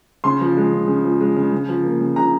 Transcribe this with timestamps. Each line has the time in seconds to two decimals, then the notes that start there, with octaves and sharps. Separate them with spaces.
0.24 C#3 C6
0.41 F3
0.57 G#3
0.73 C#3
0.88 C#3
1.04 F3
1.20 G#3
1.36 C#3
1.53 C#3
1.69 F3
1.84 A#3
2.00 C#3
2.16 C#3 A#5